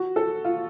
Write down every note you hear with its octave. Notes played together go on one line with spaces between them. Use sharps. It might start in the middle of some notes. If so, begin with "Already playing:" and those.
Already playing: F#4
A4
F4